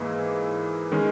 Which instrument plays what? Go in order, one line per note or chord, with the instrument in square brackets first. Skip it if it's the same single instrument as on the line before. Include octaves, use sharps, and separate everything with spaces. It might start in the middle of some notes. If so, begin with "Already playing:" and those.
Already playing: [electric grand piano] G#2 E3 A#3 E4 G#4
D#3 G#3 C#4